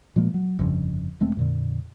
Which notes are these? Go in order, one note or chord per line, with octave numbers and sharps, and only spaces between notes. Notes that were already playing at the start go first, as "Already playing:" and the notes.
A#2 F3 G#3 A#3
F#3
G1 F2 C#3
E1 G#3 A3 C4
F2 A#2 D3